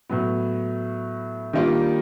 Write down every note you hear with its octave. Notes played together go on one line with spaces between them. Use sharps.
A2 F#3 B3
D#3 G3 A#3 D4 F4